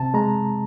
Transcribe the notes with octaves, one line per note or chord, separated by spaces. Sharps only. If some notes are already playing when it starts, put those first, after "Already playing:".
Already playing: C3 A5
G#3 A#5